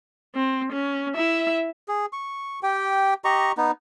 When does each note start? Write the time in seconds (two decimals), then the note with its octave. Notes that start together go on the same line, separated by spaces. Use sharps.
0.35 C4
0.72 C#4
1.16 E4 E5
1.88 G#4
2.13 C#6
2.63 G4 G5
3.24 G4 D#5 A#5 C#6
3.57 B3 D#4